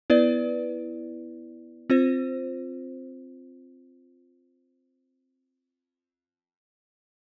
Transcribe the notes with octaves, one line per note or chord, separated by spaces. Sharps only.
B3 E4 B4 D5
C4 F4 C5